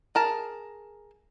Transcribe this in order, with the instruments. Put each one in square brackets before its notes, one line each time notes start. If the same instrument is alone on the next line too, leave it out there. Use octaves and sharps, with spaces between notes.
[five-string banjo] G#4 A#4 A5